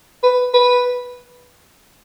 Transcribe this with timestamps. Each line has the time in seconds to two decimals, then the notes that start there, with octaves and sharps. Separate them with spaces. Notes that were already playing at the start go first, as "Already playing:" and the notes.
0.23 B4
0.54 B4